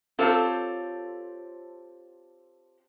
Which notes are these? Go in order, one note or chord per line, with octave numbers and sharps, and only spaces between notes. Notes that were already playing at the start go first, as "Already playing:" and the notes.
C4 F4 G4 A4 C5 C#5